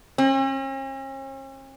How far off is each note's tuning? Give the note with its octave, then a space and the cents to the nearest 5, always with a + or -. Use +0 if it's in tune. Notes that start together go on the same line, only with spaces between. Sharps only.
C#4 -45